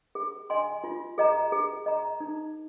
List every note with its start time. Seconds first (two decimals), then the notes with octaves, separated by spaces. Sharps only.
0.15 G#4
0.50 D#5 G#5 C6
0.84 F4
1.18 G#4 D#5 A#5
1.52 G#4
1.86 D#5 A#5
2.20 D#4